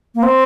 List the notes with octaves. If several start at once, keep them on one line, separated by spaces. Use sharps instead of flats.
A#3
C4